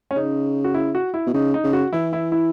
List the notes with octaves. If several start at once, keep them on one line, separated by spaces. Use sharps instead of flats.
C#4
C#3 D#4
F#4
E4
F#4
E4
B2
C#3 D#4
D#4
C#3
F#4
E3 E4
E4
E4